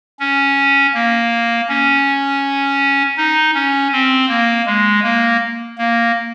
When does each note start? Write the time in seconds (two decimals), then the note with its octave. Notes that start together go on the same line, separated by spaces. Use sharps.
0.20 C#4
0.94 A#3
1.69 C#4
3.17 D#4
3.54 C#4
3.92 C4
4.29 A#3
4.66 G#3
5.03 A#3
5.78 A#3